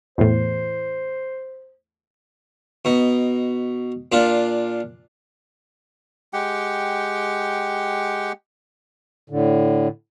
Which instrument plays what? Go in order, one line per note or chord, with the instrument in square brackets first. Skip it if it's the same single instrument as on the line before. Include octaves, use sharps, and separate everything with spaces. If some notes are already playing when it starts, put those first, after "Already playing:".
[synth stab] E2 A2 [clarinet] C5
[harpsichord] B2 D#4
A#2 D4 F4
[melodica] G#3 G4 F#5 G5
[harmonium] A2 D3